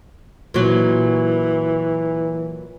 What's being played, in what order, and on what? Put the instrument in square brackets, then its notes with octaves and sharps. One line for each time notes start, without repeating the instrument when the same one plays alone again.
[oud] A#2 F#3 [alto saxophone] E3